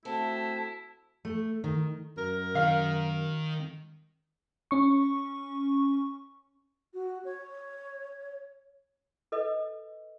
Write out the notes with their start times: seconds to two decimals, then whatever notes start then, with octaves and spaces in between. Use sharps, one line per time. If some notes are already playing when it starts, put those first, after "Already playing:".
0.05 A3 C4 E4 F#4 A5
1.25 A3
1.64 D#3
2.18 F#2 A#4
2.55 D#3 F5
4.71 C#4 C#6
6.94 F#4
7.25 C#5
9.32 A4 B4 D#5